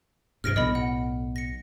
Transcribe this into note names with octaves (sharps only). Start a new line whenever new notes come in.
G2 C3 F6 A#6 D7
B1 A2 D#5 B5
F#5
A#6 C#7